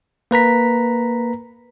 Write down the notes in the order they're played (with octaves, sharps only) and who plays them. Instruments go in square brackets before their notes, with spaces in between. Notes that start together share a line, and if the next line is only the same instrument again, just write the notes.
[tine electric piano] A#3 B4 A#5 B6